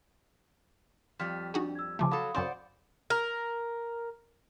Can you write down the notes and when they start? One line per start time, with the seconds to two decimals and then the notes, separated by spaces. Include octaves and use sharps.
1.19 F2 G3 F6 B6
1.54 D4 D#4 F#4 G#4
1.75 E6 G#6
1.99 C#3 F3 A3 A5 D6
2.11 F#3 A4 F5 B5 D#6
2.35 F#2 C#3 C4 C5 D5 F#5
3.10 A#4